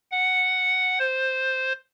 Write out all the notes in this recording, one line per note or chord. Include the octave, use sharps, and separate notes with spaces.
F#5
C5